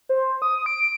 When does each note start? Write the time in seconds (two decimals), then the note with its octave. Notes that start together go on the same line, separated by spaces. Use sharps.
0.09 C5
0.42 D#6
0.66 D7